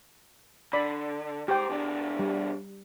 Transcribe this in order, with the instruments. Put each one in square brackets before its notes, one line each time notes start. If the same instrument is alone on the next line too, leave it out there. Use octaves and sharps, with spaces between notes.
[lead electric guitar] D3 [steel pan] D5 B5
[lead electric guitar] G#2 C5 [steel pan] G4 G5
[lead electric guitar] B2 D4
[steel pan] G3